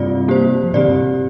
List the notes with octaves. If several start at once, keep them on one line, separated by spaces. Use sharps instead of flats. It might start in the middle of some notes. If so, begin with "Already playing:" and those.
Already playing: G2 C3 C4 F4 D5
A#3 G4 C5
F3
A#2 D3 C4 G4 D5
G2 C3